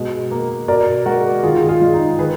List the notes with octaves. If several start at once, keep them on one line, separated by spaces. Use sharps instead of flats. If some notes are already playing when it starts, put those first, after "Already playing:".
Already playing: B2 G#3
A#3
B2 A#4 D5
G#3 F#4 A#4
D#3 F4 G#4
F4 G#4
G#3
D#4
D#3 G#4 B4